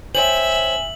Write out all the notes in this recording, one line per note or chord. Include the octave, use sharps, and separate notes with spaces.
C5 C#5 E5 G5 G#5 F#7